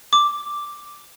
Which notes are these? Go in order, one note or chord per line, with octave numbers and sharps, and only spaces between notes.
D6